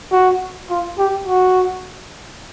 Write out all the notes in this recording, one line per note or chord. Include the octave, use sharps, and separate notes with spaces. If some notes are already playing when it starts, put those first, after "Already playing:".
F#4
F4
G4
F#4